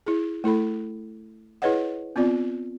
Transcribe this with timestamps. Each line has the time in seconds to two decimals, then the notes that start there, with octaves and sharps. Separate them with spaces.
0.06 E4 G#4
0.44 A3 E4 A4 B5
1.62 E4 G#4 B4 C#5 D#5 F#5
2.16 B3 C4 F4 D5